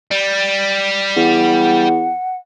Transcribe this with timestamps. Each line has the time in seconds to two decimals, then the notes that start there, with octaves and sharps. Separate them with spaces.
0.11 G3
1.17 E2 F#5